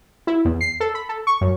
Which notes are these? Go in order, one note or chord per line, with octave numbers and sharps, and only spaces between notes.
E4
E2
C7
A4
B5
A4
C#6
F#2